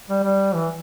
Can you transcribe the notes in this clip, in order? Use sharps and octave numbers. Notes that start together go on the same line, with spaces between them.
G3
G3
E3